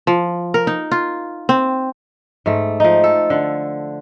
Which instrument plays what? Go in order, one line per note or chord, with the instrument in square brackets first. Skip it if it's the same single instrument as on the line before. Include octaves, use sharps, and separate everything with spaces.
[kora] F3
A#4
D#4
F4
C4
G#2 A3
F3 D#4
A4
D3